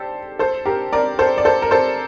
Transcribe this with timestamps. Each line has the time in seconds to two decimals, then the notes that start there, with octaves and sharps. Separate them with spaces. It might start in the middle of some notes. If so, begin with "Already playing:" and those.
Already playing: G4 A4 C5 D5
0.39 A4 C5
0.65 G4 A#4
0.93 A#4 D5
1.19 A4 C5
1.38 D5
1.45 A4 C5
1.62 A#4
1.71 A4 C5